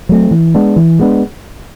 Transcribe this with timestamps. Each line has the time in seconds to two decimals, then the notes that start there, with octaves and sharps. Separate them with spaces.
0.09 F#3 A3 C4
0.31 E3
0.55 G#3 B3 D4
0.76 E3
0.99 G#3 B3 D4